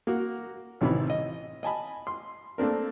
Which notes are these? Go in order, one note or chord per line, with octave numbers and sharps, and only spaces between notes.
A#3 F#4
A1 C3 D#3 E3 B5
D#5
D#5 G#5 A5 B5
C6
A3 A#3 C4 D4 A#4